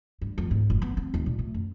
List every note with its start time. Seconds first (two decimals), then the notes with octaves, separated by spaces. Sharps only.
0.21 G2
0.38 F2
0.51 G#2
0.70 F#1
0.82 B3
0.97 C4
1.14 D#2
1.26 A#2
1.39 A3
1.54 F#2